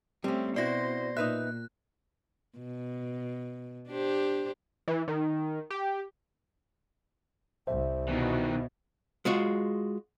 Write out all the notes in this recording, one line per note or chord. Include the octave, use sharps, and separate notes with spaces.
G3 A3 C4 C#4
B2 C4 E4 F#4 C5 D5 A#6
A#2 D#4 B4 E5 F#6
B2
D4 G4 C5
E3
D#3
G4
C2 C5 E5
B2 D#3 E3
G#3 F4 F#4